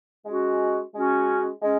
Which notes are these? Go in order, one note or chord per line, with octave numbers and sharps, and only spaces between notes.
G#3 C#4 F#4
G#3 C#4 F#4
G#3 C#4